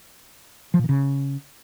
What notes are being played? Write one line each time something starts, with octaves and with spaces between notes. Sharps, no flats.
F3
A#2
D#3
C#3